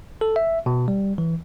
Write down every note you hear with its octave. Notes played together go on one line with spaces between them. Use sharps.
A4
E5
B2
G3
E3